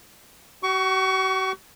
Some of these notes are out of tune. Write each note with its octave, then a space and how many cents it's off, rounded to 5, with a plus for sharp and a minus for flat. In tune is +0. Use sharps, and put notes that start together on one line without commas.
F#4 +45 C#6 +20